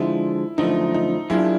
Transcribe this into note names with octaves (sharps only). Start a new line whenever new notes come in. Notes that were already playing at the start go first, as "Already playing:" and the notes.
Already playing: D3 F3 G#3 E4
F#2 D3 F3 A3 D#4
D#4
F#3 A#3 D4 E4 F4 G#4